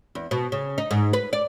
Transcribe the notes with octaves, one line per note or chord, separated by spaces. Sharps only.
E2
B2
C#3
D#4
G#2
B4
D5